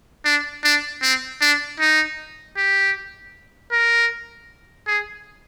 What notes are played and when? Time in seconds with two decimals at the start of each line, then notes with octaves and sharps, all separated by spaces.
0.25 D4
0.64 D4
1.02 C4
1.41 D4
1.80 D#4
2.57 G4
3.72 A#4
4.87 G#4